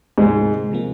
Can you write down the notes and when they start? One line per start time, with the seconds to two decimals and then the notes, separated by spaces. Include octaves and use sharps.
0.18 D2 G#2 C3 F3 G#3 A#3
0.72 C3 F3 A#3